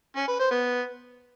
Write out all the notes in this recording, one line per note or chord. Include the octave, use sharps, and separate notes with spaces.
C#4
B4
C5
B3